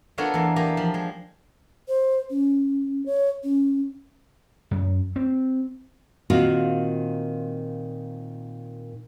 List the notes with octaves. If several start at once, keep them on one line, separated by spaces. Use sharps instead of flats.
B3 D4 F4 A4 A#4 C#5
E2 A#3
A#3 G4 D5 G#5 A#5
F3 B5
G#3
C5
C#4
C#5
C#4
F#2
C4
A#2 D#3 C4 F4 F#4